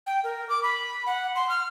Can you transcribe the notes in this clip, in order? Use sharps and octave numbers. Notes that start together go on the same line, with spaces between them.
G5
A#4
D6
B5
F#5
C6
F6